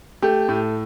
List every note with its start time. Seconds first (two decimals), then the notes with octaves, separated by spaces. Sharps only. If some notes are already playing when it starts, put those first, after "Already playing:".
0.22 A3 G4
0.49 A2